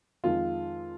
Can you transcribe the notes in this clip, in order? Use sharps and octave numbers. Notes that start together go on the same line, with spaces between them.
F2 D#3 G#3 F4